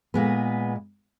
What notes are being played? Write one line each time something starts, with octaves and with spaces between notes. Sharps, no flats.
A#2 G#3 B3